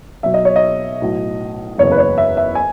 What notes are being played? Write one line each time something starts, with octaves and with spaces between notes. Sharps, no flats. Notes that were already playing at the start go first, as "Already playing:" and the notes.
B1 B2 F#3 E5
D#5
C#5
D#5
B1 A2 F#3
F#1 E2 C#3 C#5
B4
C#5
E5
E5
G#5